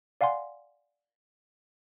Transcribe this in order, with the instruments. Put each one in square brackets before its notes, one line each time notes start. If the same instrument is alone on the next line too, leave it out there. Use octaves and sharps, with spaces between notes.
[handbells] D5 F5 F#5 G#5 C6